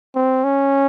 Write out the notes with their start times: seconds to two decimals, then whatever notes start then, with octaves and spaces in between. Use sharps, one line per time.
0.15 C4
0.44 C#4